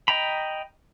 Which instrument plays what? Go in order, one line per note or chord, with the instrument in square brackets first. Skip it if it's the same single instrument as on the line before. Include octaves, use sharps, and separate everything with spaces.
[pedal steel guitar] D#5 G5 A#5 B5